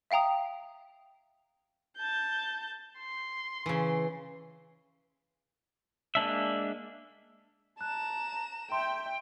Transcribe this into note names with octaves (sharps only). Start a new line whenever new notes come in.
E5 F5 G5 A#5 D#6
A5 G6
C6
C#3 E3
G#3 A#3 D4 E5
A5 A#5 F#6 E7
E5 G5 C6